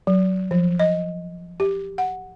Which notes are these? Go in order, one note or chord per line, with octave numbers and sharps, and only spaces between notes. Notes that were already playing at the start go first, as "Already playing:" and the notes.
F#3
F3
D#5
G4
F#5